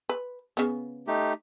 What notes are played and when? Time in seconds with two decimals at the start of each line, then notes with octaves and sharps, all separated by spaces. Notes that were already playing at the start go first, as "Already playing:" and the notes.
0.09 B4
0.57 C#3 B3
1.07 A3 D#4 G4